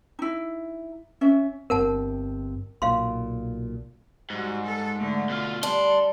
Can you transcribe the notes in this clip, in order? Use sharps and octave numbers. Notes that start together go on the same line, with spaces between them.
D#4 E4
C#4 E5
G1 G2 C4 A#4 F#5 A5
B1 A#2 F5 C6
G#2 G3 F#4
A4
D3 A3
B2 F4
G3 D4 C6